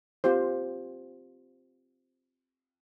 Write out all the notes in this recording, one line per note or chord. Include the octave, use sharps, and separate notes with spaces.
C4 F4 G4 C5